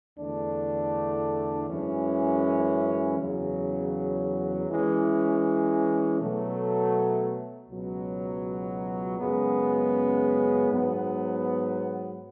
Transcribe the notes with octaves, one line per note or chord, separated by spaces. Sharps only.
E2 D3 A3 D4
F#2 E3 G#3 C#4
E2 C#3 F#3
E3 G#3 C#4
B2 F#3 A3
C#2 B2 F#3
F#2 C#3 G#3 B3
G#2 F#3 B3